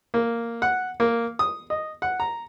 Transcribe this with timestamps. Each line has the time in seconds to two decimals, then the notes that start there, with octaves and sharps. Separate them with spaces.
0.14 A#3
0.62 F#5
1.00 A#3
1.39 D#6
1.70 D#5
2.02 F#5
2.20 A#5